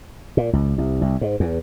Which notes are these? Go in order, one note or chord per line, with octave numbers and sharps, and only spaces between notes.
A#2
C#2
C2
C2
G#2
E2